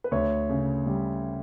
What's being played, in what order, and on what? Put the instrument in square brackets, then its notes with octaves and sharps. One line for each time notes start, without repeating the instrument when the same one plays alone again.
[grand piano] B4
D2 C#5
C#3
G3